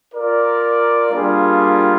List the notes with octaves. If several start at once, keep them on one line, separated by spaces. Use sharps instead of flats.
F4 A#4 D5
G3 A#3 D4 F4 G#4